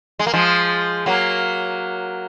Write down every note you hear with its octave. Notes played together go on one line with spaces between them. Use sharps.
G#3
A#3
F3 G#3
F#3 A#3